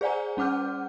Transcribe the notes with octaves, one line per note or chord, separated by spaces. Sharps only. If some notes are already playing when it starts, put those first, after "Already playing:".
G#4 C5 D5 F#5 G#5 A#5
G3 C#4 F#5 D6 F6 G6